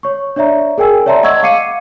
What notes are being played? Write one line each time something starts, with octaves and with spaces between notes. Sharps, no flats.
C#5 C#6
D4 C#5 D5 E5 A#5
G#4 A#4 G5 G#5 E6
C#5 D5 E5 A5 A#5 C6
D#5 F#5 C#6 E6 G#6
F5 D6 C7 C#7 D#7